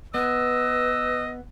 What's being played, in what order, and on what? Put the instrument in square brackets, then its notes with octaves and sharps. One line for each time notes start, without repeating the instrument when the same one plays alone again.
[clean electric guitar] B3 [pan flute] B4 [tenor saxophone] D#5 [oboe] E6